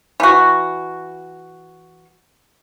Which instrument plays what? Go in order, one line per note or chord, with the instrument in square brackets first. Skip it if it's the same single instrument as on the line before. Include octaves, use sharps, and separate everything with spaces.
[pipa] E3 F#4